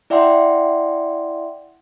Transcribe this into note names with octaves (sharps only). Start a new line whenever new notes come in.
E4 D5 E5 F#5 G5 C6